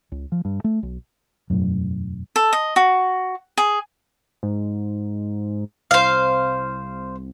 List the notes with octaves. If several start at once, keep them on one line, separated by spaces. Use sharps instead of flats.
C#2
F3
G2
A3
B1
E1 F#2 A2
A4
D#5
F#4
G#4
G#2
C2 C5 F5